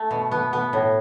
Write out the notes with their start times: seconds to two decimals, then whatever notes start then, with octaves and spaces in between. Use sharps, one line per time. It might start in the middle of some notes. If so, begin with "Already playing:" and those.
Already playing: A3
0.11 B2
0.31 B3
0.53 B3
0.73 A2